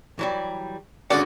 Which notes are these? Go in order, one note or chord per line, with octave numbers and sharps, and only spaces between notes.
E3 F#3 G3
G#1 D3 C#4 D4 F#4 G#4 D5 F#5